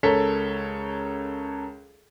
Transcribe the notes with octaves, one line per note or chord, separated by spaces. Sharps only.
C#2 A4 A#4 C#5 B6